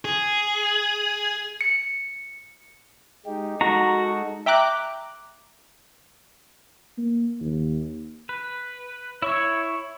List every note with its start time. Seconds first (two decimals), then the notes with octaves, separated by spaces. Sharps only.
0.05 G#4
1.61 C#7
3.26 G#3 D#4 G4
3.61 G#3 D#4 F#4 A4 A#5
4.46 E5 G5 A#5 D6 F#6
6.98 A#3
7.41 D#2
8.29 B4
9.22 E4 C#5 C#6 E6